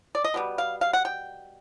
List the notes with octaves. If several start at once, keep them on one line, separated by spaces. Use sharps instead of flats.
D5
D#5
B2 G3 B3
F5
F5
F#5
G5